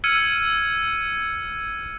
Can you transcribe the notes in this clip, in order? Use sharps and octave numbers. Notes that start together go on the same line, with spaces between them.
E6 F6 G#6 C#7 D#7